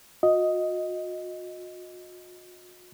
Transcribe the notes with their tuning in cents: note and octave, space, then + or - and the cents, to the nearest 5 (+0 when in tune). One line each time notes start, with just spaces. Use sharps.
F#4 -45 D#5 +5